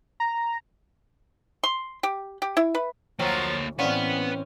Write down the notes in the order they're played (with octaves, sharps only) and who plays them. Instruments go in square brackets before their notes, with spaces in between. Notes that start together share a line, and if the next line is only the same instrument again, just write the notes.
[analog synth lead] A#5
[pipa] C6
G4
G4
E4
B4
[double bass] D2 [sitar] F3 F#3 [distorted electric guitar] A#3 C#5 [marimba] G5 A#5
[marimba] A2 D5 F5 [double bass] E3 C4 [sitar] C#4 [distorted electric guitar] B4 F#5